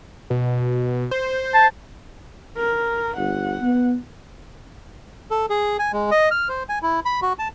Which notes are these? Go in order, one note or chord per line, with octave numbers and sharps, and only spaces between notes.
B2
C5
A5
A#4
G1 F#5
B3
A4
G#4
G#5
G#3
D#5
F6
C5
G#5
E4
B5
F#4
A5